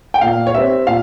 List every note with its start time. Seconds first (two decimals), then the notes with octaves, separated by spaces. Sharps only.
0.14 G5
0.21 A#2 F5
0.47 C#5
0.54 G3 C4 E5
0.87 A#2 F5